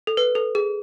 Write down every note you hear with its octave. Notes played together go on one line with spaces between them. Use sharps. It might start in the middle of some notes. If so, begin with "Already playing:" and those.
A4
B4
A4
G#4